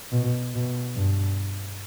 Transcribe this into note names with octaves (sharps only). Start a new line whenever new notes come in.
B2
B2
G2